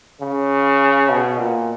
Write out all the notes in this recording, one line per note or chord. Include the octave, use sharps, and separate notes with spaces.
C#3
B2
A#2